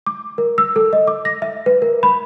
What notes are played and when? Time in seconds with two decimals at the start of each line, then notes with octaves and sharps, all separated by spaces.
0.07 D6
0.38 A#4
0.58 E6
0.76 A4
0.93 D#5
1.07 D6
1.25 A#6
1.42 E5
1.66 B4
1.82 A#4
2.03 B5